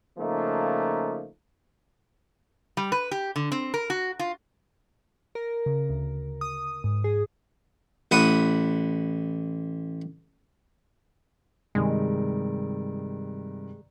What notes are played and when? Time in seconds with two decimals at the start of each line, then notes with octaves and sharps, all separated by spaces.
0.19 C#3 F3 A3 A#3 D#4
2.77 G3
2.92 B4
3.11 G4
3.36 D3
3.52 C4
3.74 A#4
3.90 F#4
4.19 F4
5.35 A#4
5.66 C#3
5.90 D2
6.41 D#6
6.84 G#2
7.04 G#4
8.11 A1 F#5 B5 D#6
11.75 G2 C3 D#3 G#3